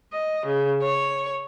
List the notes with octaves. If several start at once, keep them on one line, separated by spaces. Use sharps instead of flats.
D#5
C#3
C#5